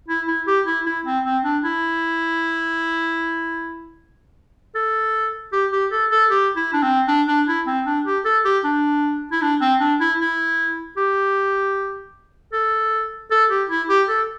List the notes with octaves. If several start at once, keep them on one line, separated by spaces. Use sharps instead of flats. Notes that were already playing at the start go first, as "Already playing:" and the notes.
E4
E4
G4
E4
E4
C4
C4
D4
E4
A4
G4
G4
A4
A4
G4
E4
D4
C4
D4
D4
E4
C4
D4
G4
A4
G4
D4
E4
D4
C4
D4
E4
E4
G4
A4
A4
G4
E4
G4
A4